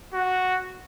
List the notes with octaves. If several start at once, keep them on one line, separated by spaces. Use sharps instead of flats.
F#4